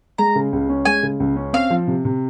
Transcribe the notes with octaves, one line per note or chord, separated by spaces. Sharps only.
G#3 A#5
C#3
C#2
C#4
G#3 G#5
C#3
C#2
C#4
C4 F5
F3
C3
C3